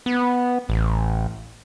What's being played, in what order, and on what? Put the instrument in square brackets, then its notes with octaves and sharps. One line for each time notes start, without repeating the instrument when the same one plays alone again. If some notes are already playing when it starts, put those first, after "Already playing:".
[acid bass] B3
A1